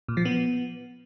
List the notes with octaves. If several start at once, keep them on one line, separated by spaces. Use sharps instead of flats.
A#2
F3
B3